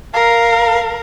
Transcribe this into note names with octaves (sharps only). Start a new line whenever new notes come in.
A#4 F5